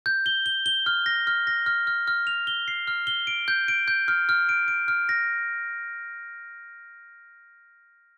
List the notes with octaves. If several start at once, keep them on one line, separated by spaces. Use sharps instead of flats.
G6
G7
G7
G7
F6
A#6
F6
A#6
F6
F6
F6
F7
G7
C7
F6
G7
D7
G6
D7
G6
F6
F6
D7
D7
F6
A#6